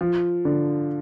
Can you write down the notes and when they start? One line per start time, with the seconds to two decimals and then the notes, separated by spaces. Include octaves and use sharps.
0.01 F3
0.45 D3